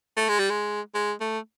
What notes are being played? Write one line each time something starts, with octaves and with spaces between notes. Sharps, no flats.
A3
G#3
G3
G#3
G#3
A3